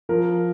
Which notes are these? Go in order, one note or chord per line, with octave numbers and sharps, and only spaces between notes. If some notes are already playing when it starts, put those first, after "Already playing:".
F3 A#4